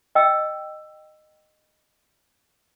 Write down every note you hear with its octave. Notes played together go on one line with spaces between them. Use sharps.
D#5 G5 E6